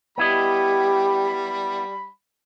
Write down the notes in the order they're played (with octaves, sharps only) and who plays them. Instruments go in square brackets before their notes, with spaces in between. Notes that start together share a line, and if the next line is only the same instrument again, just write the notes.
[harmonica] G3 B5 [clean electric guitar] B3 E4 D#5 [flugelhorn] G4